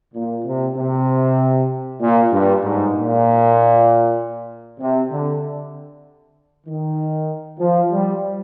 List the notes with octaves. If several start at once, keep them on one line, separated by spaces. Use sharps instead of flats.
A#2
C3
C3
A#2
G2
G#2
A#2
C3
D3
D#3
F3
G3